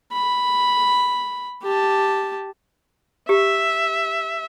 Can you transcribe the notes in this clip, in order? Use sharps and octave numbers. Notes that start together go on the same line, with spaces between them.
B5
G4 A5
G4 E5